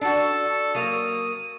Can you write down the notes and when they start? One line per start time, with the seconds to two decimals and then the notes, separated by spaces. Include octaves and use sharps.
0.01 D4 F#4 A4
0.75 F#3 A#3 D#6